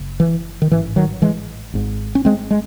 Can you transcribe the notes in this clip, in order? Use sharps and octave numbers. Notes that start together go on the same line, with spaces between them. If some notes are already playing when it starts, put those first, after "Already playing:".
Already playing: F#1 F#2 C#3
E3
D#3
A1 G#2 E3
D#3 F#3
E3 G#3
G#1 G#2
C#4
G#3 C4
G#3